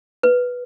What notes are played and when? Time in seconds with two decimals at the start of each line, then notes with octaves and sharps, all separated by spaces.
0.23 B4